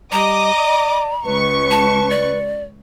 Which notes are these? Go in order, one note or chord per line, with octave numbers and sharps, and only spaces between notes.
G3 D#5 A#5 D6
D5
C#2 B4 C#6
A5
D5